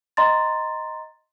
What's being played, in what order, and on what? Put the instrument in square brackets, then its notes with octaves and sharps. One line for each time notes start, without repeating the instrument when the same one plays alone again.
[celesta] D#5 A#5 C6 A6